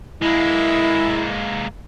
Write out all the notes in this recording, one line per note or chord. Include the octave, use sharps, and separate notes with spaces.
G#3 A#3 E4